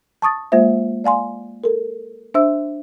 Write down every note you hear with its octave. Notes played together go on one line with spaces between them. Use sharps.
A5 C#6 D#6 A6
G#3 A#3 F4 C5 E5
D5 F5 G#5 C6
A4 A#4
D4 C5 E5 E6